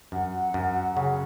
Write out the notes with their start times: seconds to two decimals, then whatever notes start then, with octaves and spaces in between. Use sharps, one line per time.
0.12 F#2 F#5
0.54 F#2
0.97 C#3 G#5
1.02 F#5